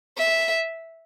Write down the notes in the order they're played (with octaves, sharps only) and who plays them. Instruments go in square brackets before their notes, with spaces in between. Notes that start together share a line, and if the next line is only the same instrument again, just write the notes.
[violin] E5